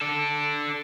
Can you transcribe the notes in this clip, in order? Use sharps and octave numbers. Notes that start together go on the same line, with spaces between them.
D4 A4